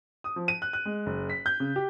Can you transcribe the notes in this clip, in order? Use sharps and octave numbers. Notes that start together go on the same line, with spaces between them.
D#6
F3
D#7
F#6
F#6
G#3
F#1
B6
G6
C#3
G4